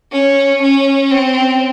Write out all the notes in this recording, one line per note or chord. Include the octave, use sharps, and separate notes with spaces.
C#4
C#4
C4